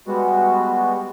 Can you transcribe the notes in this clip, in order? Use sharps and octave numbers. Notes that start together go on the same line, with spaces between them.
G3 G#3 B3 F#4